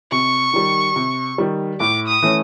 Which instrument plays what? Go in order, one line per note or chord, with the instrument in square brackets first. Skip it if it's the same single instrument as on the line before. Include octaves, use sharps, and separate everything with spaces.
[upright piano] C3 [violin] C#6
[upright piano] D#3 G3
C3
D#3 G3
[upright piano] A2 [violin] D6
[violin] D#6
[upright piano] E3 A3 C#4